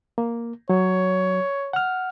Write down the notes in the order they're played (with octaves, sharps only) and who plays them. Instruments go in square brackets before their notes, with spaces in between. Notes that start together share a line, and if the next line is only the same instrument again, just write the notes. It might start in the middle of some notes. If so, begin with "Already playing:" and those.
[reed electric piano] A#3
[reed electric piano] F#3 [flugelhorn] C#5
[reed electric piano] F#5 F6